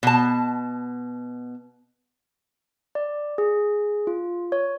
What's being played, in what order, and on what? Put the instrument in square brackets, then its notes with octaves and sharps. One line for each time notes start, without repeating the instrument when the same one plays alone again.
[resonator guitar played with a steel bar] B2 A5
[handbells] D5
G#4
F4
C#5